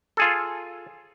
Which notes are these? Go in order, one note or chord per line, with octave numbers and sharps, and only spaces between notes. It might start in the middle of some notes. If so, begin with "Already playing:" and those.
F4 G#4 A4